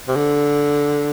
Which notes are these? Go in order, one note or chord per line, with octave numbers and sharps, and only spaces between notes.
C3
D3